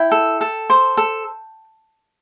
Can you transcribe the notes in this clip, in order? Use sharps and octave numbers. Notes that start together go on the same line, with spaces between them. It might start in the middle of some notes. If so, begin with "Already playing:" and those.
Already playing: E4 G5
A4
A4
C5
A4